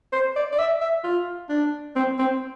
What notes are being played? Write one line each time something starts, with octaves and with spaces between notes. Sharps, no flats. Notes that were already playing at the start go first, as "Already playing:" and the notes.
C5
D5
D5
E5
E5
F4
D4
C4
C4